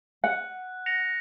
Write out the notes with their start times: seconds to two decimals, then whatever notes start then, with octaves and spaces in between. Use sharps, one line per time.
0.24 F#5 F#6
0.86 A#6 C#7 F7